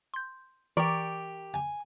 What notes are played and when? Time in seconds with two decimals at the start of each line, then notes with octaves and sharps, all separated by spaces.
0.14 C6 G6
0.77 E3 G4 A#4 D5 C#6
1.54 G#5